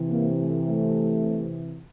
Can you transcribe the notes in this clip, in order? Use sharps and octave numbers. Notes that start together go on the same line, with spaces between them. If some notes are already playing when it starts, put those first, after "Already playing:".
Already playing: C3 E3
A#3
A3
A3